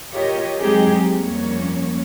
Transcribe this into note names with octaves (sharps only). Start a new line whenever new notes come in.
F4 G4 A#4 C#5 D#5
F#3 G#3 C4 D#4 G4 G#4
F2 G3 A#3 C#4 C#5